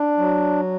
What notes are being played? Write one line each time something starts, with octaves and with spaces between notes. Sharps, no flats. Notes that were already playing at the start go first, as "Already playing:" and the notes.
Already playing: D4
F#3